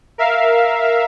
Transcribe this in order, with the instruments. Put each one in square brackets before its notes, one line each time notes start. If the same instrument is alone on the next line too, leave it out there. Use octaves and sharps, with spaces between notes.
[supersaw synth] A#4 E5 F5